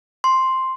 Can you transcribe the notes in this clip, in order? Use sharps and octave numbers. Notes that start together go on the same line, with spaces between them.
C6